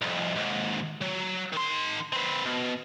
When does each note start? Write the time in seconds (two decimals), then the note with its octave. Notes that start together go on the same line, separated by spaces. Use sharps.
0.02 C2 F2
0.36 D#2 G#2
1.02 F#3
1.52 D#3 C6
2.13 C4 B4
2.45 B2